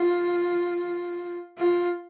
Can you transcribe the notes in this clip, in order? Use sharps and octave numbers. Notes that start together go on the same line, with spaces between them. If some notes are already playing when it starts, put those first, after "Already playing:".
Already playing: F4
F4